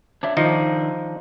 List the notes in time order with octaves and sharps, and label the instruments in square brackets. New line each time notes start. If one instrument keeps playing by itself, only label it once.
[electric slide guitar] D4 C#5 E5
[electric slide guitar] D#3 D4 [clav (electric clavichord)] F3 D#4